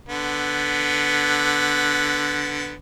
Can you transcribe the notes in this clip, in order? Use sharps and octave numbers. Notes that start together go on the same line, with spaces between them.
D3 B3